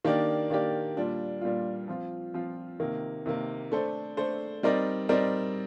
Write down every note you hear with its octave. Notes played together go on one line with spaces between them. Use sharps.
D#3 A#3 D4 G4 D5
D#3 A#3 D4 G4 D5
A#2 G3 D4 F4
A#2 G3 D4 F4
F3 C4 F4
F3 C4 F4
C3 D#3 A#3
C3 D#3 A#3
A3 D4 A4 C5
A3 D4 A4 C5
G3 C4 D#4 A#4 D5
G3 C4 D#4 A#4 D5